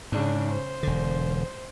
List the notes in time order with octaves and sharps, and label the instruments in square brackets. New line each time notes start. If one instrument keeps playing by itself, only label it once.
[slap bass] G#2 [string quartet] C#3 D4
[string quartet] C5
[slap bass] E1 D3